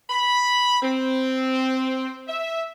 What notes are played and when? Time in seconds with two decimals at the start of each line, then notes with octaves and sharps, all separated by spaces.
0.10 B5
0.83 C4
2.28 E5